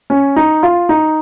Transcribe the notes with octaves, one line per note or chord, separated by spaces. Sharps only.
C#4
D#4
F4
D#4